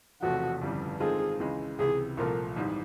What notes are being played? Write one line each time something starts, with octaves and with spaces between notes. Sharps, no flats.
E1 E2 C3 F3 A3 F#4
G1 F2 C#3 E3 G3
D#3 G#3 C4 F4 G#4 A4
C#2 C#3 E3 G#3
C#2 C3 E3 G#4
C2 A#2 F3 A3 A#4
G#1 G#2 E3 G3